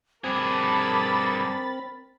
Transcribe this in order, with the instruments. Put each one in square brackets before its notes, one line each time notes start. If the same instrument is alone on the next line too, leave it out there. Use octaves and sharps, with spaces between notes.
[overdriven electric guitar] G2 G#4 [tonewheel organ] C4 [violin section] A#4 B5 A6 [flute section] A5 D6